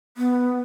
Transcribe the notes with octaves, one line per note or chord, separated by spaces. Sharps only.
B3